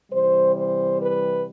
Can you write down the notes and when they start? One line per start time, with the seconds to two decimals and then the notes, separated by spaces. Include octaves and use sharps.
0.11 C3 E3 G3 C5
0.57 C5
1.02 B4